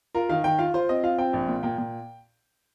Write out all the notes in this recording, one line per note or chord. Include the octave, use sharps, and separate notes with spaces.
F4 A#4
D#3 F5
D#3 G5
F4 F5
F4 C5
C4 D#5
F4 F5
C4 G5
A#1
A#2
A#2 G5
A#2